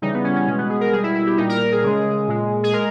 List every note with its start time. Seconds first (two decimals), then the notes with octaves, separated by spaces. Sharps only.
0.02 C#3 E3 G3 D#4
0.14 B3
0.24 C#4
0.36 C#4
0.47 B2 G#3 C#4
0.58 B3
0.70 G#4
0.81 A#4
0.93 B2 G3 G#4
1.03 E4
1.15 E4
1.26 G4
1.37 A#2 G3 D#4
1.49 A#4
1.60 A#4
1.72 G#4
1.83 C#3 G#3
2.28 A#2 G#3
2.64 G#4
2.73 G#3 A#4